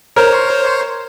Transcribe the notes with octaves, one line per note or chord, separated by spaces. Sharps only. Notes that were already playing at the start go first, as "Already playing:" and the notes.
A#4 C5 C#5